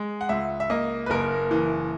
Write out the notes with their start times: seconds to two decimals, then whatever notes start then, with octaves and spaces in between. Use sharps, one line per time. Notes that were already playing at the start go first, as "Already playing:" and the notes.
Already playing: G#3
0.21 F#5
0.29 C#2 E5
0.60 E5
0.70 A#3 D#5
1.06 B4
1.10 F#1 A#4
1.51 E3